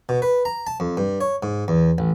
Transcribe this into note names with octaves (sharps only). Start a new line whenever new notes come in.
B2
B4
A#5
A5
F2
G2
C#5
G#2
E2
A1